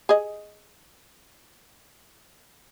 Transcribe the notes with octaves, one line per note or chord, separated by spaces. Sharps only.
G#4 D#5